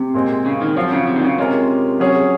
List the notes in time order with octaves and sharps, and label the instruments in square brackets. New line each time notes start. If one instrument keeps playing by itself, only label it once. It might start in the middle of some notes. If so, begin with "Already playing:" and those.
Already playing: [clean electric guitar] C3
[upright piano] A#2 G#3 C4
[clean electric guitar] C#3
D#3
[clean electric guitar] F3 [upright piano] F#3 C4 F4
[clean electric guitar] C#3
C3
D#3
C#3
[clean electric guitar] C3 [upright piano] G#3 C#4 F4 A#4
[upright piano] F#3 C#4 G#4 C#5